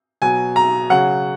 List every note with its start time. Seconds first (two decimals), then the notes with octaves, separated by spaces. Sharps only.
0.22 B2 F#3 G#5
0.56 A#5
0.90 C#3 F#3 F#5